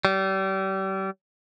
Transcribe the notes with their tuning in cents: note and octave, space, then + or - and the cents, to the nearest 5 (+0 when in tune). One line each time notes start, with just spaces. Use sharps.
G3 -35